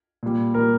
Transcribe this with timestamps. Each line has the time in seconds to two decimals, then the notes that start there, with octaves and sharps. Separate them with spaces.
0.23 A#2 G3
0.54 A#2 G3 A#4